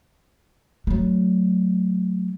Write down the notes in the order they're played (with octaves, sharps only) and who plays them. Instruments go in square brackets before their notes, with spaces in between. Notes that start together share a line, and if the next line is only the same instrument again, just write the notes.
[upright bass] F#3 A3